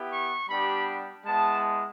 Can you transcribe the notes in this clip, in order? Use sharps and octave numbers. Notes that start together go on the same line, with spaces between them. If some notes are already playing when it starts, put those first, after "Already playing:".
Already playing: B3 E4 G4
C#6
G3 B3 D4 G4 B5
G#3 B3 E4 A5